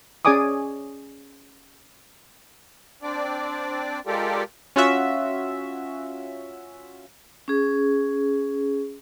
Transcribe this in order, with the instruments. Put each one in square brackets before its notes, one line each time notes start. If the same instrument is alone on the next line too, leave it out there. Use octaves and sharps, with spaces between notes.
[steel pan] C#4 G#4 D5 G#5 D6 D#6
[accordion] C4 D4 D5
G#3 F4 G4 A4 A#4 D5
[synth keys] C#4 F4 F#4 E5
[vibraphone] C#4 G#4